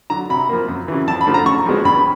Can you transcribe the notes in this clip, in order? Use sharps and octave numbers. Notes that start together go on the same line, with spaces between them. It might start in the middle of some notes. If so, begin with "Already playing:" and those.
D3 F#3 A#5
C3 B5
F3 A#3
F#2
C#3 E3
F2 A5
B5
D3 F3 A3
A#5
C#3 C#6
F3 G#3 B3
G2 B5